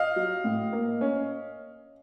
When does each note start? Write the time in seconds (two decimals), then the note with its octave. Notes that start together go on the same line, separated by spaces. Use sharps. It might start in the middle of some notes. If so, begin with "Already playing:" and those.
Already playing: D#5 F5
0.16 F#3
0.44 A2
0.73 A#3
1.01 C#4